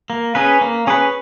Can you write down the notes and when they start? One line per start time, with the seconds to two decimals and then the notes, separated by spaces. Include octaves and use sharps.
0.10 A#3
0.35 C#4 G#4 B4
0.61 A#3
0.87 C#4 G#4 B4